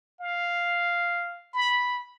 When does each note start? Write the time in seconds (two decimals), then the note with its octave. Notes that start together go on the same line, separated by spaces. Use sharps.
0.21 F5
1.53 B5